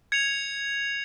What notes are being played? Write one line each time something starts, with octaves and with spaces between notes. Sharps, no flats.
G#6 C#7 F7